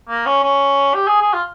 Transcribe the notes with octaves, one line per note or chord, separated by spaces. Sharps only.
A#3
C#4
C#4
G4
G#4
G#4
F4